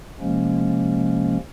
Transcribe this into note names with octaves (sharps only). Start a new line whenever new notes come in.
C3 F3 G#3 A#3 C#4